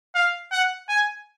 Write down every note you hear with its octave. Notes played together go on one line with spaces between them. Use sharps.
F5
F#5
G#5